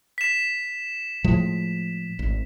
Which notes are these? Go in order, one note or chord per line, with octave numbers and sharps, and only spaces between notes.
B6 E7
A2 F3 G#3
G#1